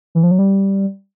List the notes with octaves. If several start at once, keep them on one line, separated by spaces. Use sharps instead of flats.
E3
F3
F#3
G3